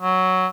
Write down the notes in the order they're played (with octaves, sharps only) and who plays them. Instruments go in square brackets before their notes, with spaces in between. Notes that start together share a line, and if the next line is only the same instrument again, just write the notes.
[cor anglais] F#3